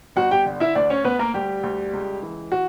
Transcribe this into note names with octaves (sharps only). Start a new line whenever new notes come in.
G1 F#4 F#5
G4 G5
D3
E4 E5
D2 D4 D5
C#4 C#5
D2 B3 B4
A#3 A#4
D2 G3 G4
D2
C#2
E3
F#4